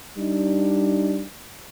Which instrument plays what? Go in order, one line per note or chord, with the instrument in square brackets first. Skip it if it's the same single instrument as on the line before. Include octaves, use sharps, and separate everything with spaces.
[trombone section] G3 D4 D#4